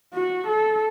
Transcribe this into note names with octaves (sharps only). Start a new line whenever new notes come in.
F#4
A4